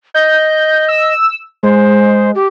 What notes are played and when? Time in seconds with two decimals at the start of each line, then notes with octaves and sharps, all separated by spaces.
0.15 D#5 G6
0.88 E6
1.63 G#3 C5
2.35 G4